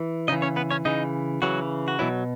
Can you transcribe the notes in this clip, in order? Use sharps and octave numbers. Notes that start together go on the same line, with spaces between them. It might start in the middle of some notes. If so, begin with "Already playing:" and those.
Already playing: E3
C#3 E3 D#4 D#5
C#4 C#5
B3 B4
C#4 C#5
C#3 E3 D#4 D#5
C#3 E3 F#3 F#4
F#4
B2 E3 F#3 E4